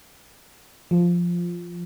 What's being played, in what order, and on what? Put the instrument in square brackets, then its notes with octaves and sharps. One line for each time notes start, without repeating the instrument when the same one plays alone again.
[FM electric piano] F3